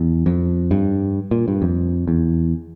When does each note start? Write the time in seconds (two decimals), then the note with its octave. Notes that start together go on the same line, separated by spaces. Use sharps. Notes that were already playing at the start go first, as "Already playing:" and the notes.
Already playing: E2
0.26 F2
0.71 G2
1.31 A#2
1.48 G2
1.62 F2
2.08 E2